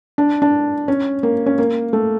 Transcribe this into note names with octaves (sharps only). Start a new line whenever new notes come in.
D4
D4
C#4
A#3
C#4
A#3
A3